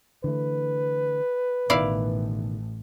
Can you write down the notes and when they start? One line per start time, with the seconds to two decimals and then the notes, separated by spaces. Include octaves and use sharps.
0.24 D3 E3 A3 B4
1.70 A1 B2 D#3 E4 D5 F5